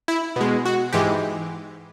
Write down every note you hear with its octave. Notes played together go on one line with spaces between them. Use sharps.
E4
B2 G#3
F#4
G#2 E3 G#3 G4